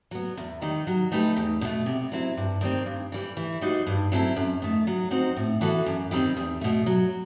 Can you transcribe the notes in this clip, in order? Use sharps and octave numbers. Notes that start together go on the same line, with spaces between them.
F#3 B3
E2
D#3 G3 D#4
F#3
A3 D#4 G4 B4
E2
B2 A3
C3
F#3 C4 E4
G2
D#3 G3 C4
G2
E3 G3
E3
G3 D#4 F#4 C5
G2
F#3 C4 E4 A4
F#2
D#3 A3
F#3
C4 D#4 F#4 C5
A2
E3 B3 F#4 A4
F#2
D#3 G3 C4 D#4
E2
B2 A3
F#3